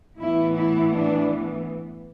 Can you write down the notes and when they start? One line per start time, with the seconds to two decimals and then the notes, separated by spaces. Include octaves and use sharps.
0.18 A2 E3 B3 E4
0.56 E4
0.94 D4